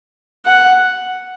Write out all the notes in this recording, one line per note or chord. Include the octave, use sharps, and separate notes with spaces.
F#5